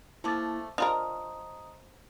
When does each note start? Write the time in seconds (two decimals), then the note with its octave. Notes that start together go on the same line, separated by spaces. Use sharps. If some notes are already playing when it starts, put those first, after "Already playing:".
0.24 F3 A3 A#3 E4 A5 D6 A6
0.78 F3 D4 F4 A#4 D#5 A#5 C6 D#6